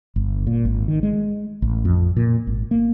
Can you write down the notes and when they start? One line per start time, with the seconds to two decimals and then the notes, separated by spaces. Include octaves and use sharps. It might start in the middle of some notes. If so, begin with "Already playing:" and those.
0.16 G1
0.47 A#2
0.65 G#1
0.88 D#3
1.03 G#3
1.62 A1
1.85 F2
2.17 A#2
2.47 G#1
2.71 A#3